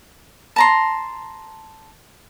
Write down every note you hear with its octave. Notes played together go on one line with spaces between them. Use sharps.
A5 A#5 C6